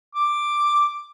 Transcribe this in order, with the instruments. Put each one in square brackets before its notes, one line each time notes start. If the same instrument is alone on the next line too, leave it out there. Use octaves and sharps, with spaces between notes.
[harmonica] D6